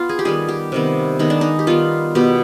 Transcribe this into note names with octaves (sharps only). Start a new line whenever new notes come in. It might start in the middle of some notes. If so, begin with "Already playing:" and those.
Already playing: B3 F4
G#4
G4
D#3 G3 B3 G#4
G4
C3 D#3 G3 B3
D#3 G#3 B3 D#4
D4
D#4
G4
D#3 G3 B3 F4
B2 B3 G4